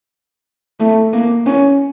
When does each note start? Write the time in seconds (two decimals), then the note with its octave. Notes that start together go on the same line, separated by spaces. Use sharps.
0.80 A3
1.13 A#3
1.46 C#4